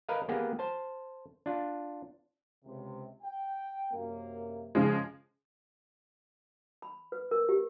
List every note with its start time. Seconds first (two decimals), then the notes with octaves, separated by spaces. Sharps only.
0.09 A#4 B4 D#5 F5
0.29 A#3 B3 G4 G#4
0.59 C5 A5
1.46 D4 F4
2.64 C#2 C3
3.23 G5
3.93 F#2 C3 A#3
4.75 C#3 F3 G#3
6.82 B5
7.12 B4
7.31 A#4
7.49 G4